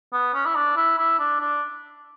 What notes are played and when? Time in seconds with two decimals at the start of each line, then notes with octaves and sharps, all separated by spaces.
0.13 B3
0.34 C#4
0.45 E4
0.55 D4
0.76 E4
0.98 E4
1.19 D4
1.40 D4